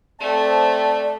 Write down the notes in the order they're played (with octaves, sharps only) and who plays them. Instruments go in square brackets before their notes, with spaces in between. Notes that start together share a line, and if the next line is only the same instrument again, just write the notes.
[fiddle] A3 [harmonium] C4 E5 [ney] D5 [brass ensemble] A5